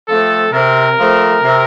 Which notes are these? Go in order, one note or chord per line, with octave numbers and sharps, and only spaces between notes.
F3 A3 C4 A4
C3 A#4
F3 A3 C4
C3